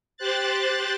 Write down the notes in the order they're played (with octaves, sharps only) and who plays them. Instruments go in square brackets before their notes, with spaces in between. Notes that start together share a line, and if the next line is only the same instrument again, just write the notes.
[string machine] G4 C5 F#6 A6